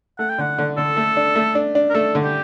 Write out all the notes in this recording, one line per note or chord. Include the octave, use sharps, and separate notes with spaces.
A3 F#5
G5
D3 F#5
D3
D3 A4
A3
D4
A3
D4
D4
A#4
A3 A4
D3
G4